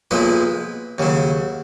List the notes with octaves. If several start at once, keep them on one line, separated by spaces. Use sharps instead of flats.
B1 A#2 F3 G#3 B4
D#2 C#3 F#3